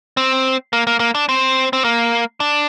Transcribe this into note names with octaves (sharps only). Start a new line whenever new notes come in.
C4
A#3
A#3
A#3
D4
C4
C4
A#3
D4